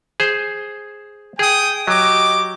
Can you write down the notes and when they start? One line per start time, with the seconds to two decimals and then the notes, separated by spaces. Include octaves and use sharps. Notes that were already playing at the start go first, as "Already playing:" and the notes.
0.20 G#4 C5
1.39 G#4 G5 G#5 D#6
1.88 F#3 G4 D#5 D6